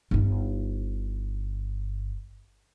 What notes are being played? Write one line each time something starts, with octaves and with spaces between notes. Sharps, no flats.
G1 D#4